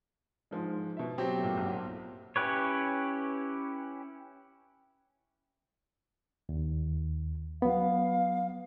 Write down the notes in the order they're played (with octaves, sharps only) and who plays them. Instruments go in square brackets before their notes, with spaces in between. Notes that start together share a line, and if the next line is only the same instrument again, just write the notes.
[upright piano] G#2 F3 G#3
B2 E5
[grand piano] F#3 C4 G4
[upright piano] A#2 A3
B1 A#2
[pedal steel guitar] C#4 E4 G4 B4 C#5
[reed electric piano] D#2
[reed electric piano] F#3 B3 [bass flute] F5